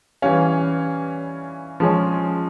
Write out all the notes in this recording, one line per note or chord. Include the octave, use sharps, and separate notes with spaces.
E3 G3 C#4 F5
F3 G#3 C#4